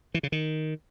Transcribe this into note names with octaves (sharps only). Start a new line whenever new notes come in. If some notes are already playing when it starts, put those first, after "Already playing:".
E3
C#3
D#3